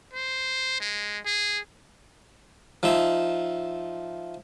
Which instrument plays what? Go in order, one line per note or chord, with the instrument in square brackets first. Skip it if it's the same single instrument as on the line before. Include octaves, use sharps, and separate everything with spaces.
[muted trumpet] C5
G#3
G#4
[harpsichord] F3 D#4 E5